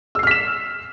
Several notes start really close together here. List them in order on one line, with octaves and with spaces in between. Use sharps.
E6 C7 F6 B6 E7